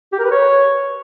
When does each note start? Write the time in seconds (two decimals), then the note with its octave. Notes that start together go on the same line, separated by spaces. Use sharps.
0.12 G4
0.19 A#4
0.25 B4
0.31 C#5